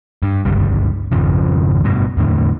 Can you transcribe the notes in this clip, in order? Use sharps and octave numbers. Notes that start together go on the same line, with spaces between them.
G2
G1 C#2 G2 G3
G#1 F2 C#3 F3
G2 B2
E2 A2 D3